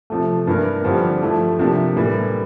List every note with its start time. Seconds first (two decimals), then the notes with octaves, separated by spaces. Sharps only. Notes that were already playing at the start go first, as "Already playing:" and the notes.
0.10 C3 F3 A3
0.47 G2 E3 A#3 E4 A#4
0.84 G2 D3 F3 C4 G4
1.22 F3 A3 E4
1.59 C3 F3 A#3 D4 G4
1.97 A2 E3 G3 A#3